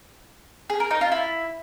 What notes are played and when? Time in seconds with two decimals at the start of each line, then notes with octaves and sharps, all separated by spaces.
0.70 G#4
0.80 A#4
0.91 D#4
1.01 F4
1.12 E4